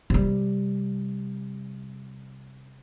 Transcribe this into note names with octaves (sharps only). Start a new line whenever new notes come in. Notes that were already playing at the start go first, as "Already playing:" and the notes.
C3 G3